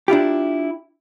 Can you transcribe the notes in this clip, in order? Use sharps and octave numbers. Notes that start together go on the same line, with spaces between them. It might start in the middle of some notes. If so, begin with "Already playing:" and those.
D4 E4 F4 G4